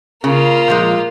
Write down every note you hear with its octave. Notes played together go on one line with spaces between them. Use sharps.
C#3 A#3 F4
A#2 F3 G#3